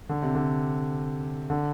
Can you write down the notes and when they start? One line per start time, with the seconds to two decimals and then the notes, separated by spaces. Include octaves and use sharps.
0.09 D3
0.22 C3
0.35 D3
1.50 D3